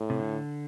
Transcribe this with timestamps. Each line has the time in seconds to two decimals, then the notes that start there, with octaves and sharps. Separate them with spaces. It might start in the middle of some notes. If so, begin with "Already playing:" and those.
Already playing: A2
0.10 C3
0.19 D3